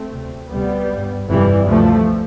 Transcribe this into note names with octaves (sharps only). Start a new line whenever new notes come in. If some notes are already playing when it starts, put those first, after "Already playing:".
Already playing: A3 C4
D2 C3
D2 C3 G3 B3
G1 G2
G1 F2 C3 E3 G3
D2 C3 F3 A3